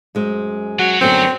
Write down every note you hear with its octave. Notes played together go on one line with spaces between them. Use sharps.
F#2 G#3 C5
F#3 F#4 C#5
F#2 D3 B3 C4